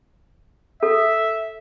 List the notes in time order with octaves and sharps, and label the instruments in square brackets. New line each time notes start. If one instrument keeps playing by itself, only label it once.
[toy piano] A4 [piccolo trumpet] E5